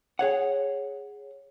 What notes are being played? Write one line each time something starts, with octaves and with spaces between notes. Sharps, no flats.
G#4 C#5 F#5